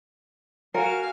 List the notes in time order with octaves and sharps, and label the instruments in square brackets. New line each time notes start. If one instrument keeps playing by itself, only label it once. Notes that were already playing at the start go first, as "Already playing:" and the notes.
[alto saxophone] F#4 [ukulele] A#4 [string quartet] F5 G#5 F6